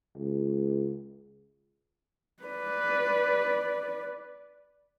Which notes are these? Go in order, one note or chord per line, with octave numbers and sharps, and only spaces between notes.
C#2
B4 D5